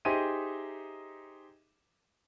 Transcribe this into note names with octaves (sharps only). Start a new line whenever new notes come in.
D#4 G4 G#4 C5 E5 D#7